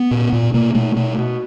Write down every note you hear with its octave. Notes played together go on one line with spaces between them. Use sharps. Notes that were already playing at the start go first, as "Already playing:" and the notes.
Already playing: B3
A#2
A#2
B2 A#3
B2 A3
B2 A3
B2